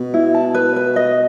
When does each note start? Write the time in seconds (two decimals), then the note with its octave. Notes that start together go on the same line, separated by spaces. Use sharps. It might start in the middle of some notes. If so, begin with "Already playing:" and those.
Already playing: B2
0.14 E4
0.34 A5
0.54 B4
0.76 B4
0.96 D#5